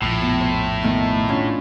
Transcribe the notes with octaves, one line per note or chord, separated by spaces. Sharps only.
A#1 F2 A2
B2
C5
B2 D#3 A3
C#4 D4 F4